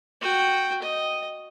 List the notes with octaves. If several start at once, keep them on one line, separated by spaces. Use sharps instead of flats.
F#4 G5
D#5